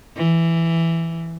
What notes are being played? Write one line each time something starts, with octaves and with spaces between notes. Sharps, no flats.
E3